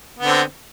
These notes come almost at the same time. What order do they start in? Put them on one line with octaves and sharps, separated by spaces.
B3 D3 C4